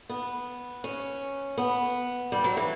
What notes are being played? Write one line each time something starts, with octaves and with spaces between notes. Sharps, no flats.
B3
C#4
B3
G3
F#3
E3